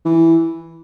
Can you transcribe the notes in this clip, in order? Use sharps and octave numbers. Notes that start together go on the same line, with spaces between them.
E3